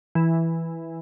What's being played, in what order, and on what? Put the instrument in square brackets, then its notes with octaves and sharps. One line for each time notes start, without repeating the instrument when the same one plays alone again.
[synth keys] E3